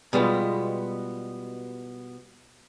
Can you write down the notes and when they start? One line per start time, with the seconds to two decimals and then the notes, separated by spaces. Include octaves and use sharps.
0.13 B2 G3 G#3 B3 F4